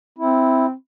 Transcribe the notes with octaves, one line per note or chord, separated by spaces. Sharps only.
C4 E4